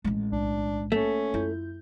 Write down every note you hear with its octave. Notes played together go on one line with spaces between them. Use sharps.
A1 G#3
B1 D4
A3 A#3 C#4 A4
F#2 E4 F4 G6